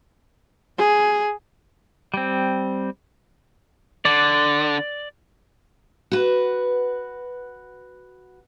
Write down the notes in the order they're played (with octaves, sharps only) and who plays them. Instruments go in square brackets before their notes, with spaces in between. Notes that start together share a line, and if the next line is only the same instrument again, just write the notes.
[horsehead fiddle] G#4
[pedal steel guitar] G3 C4
[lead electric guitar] D3 [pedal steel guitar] D5
[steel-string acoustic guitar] F#4 B4